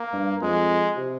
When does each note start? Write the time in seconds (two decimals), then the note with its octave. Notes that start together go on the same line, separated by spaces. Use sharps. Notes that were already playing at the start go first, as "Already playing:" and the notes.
Already playing: A#3
0.13 G2
0.42 F2 G#3
0.97 C3